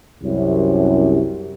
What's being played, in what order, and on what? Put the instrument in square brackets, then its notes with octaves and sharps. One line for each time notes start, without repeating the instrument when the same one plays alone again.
[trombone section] C2 F#2